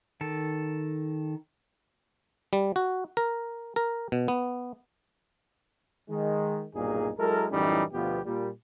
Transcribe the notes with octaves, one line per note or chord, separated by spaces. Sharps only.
D#3 A4
G3
F#4
A#4
A#4
B2
B3
D#3 G#3
B1 G2 A#2 D#4 G#4
F#3 G#3 E4 A4 A#4
F#2 A2 E3 G3 C#4 D#4
D2 B2 F3 B3 F4 G4
A#2 G3